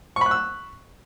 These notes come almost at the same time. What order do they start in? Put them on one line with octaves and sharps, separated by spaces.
C#6 B5 F#6 E6